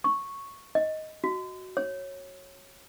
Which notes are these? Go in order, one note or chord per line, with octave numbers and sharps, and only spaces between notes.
C#6
D#5
F#4
C#5